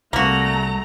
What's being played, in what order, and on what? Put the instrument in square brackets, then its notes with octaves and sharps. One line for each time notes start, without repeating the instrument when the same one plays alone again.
[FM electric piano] C2 C3 [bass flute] G3 [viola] A3 A#5 [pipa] A#3 F#4